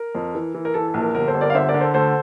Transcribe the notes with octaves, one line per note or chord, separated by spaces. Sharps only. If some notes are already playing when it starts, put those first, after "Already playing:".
Already playing: A#4
F2
E3
E3
A#4
E3 A4
A4
A#1
A#4
G1 A#4
A4 C5
G1
A#4 D5
F5
D3 C5 E5
A#4 D5
D3
A4 C5
D2 A4 C5